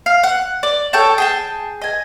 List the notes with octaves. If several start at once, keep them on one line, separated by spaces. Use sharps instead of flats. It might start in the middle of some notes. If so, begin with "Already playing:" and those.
F5
F#5
D5
A4 C#5 G5 A5
G#4 G5 A5
D#5 G#5